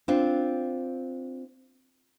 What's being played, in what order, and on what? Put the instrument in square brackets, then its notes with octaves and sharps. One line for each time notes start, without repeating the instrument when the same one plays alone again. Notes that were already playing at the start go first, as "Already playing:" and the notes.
[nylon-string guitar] C4 D4 F4